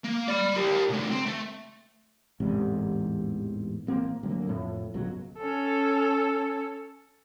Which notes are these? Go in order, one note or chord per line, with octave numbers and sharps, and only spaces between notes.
A#3
D5 B5
G4 A#4
C#3 A3
C4
A3
A1 E2 G#2 C3
A1 A#3 C4
D2 F#3 A#3
F2 A2
G1 C#2 B2 F#3
C#4 A4